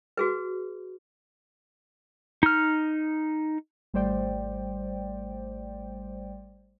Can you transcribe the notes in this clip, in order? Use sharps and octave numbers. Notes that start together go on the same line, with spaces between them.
F#4 G#4 B4
D#4 F6
G#1 G3 A3 C5 D5 G5